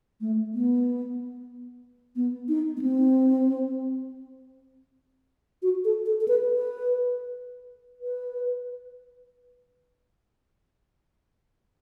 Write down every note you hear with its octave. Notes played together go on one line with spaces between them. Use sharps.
A3
B3
B3
D#4
B3
C4
F#4
A4
A4
A4
B4
B4
B4